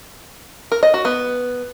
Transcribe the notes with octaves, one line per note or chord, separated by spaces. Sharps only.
A#4
D#5
F#4
B3